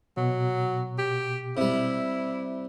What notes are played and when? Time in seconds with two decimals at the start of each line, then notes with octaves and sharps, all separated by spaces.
0.17 B2 F#3
0.98 G4
1.57 C3 G3 E4